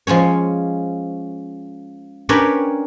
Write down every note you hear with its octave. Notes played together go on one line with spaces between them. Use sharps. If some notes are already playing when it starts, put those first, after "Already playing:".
F3 G#3 C#4 C#5
C#4 D4 G4 A#4 B4 C#5